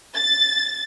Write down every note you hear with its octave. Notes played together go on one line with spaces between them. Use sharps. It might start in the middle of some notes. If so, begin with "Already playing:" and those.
A6